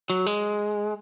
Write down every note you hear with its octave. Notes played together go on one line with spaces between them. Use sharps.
F#3
G#3